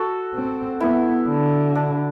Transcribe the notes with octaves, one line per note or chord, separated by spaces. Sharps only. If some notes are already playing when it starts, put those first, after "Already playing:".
Already playing: F#4 A4
C4
B3 E4
D3
D4